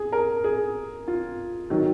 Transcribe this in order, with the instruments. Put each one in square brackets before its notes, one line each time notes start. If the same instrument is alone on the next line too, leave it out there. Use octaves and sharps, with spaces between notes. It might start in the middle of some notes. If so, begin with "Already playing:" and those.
Already playing: [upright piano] G#4
A#4
G#4
F4
D#3 F#3